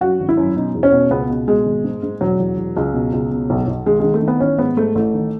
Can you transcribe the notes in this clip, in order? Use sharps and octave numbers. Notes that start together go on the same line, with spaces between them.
F#2 F#4
G#1
E4
F#2
B2 D#4
E2
C#4
B2
C#2 B3
B2
B2 G#3
G#1
G#2
G#2
E1 F#3
E1
E1
C#2
B2
C#2
B2
B1
B1
D#3 G#3
D#3 G#3
A3
D#3
B3
A1 C#4
G#2 B3
G#2 A3
A1 A3
D#3